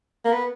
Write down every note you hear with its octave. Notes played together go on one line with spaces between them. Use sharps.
A#3
B3